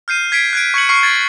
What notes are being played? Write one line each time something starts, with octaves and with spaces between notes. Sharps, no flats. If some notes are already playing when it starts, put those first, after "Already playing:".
F6 G6 C7 D#7
G#6 B6 C7 D7
F#6 G#6 D7
C#6 G#6 C#7 F#7
C#6 F6 C7 C#7
G#6 A6